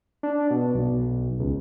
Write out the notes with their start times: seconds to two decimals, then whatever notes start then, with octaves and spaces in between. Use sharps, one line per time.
0.23 D4
0.51 B2
0.74 B1
1.39 C#2